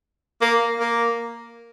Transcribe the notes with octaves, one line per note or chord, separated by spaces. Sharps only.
A#3
A#3